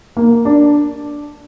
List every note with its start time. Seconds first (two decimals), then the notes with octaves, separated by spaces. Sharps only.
0.17 A#3
0.45 D4